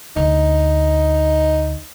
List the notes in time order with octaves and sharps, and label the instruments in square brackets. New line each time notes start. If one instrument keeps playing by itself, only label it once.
[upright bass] D2 [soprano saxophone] D#4